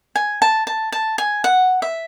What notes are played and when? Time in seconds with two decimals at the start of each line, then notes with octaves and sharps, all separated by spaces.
0.16 G#5
0.42 A5
0.67 A5
0.92 A5
1.18 G#5
1.44 F#5
1.82 E5